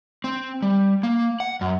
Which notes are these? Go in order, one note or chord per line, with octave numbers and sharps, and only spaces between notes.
C4
G3
A#3
F#5
F#2